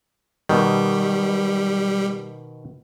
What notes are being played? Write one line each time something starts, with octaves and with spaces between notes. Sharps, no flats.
B2 D#3 G3